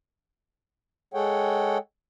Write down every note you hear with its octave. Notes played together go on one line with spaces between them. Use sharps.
G#3 G#4 A4 C#5 F#5 G5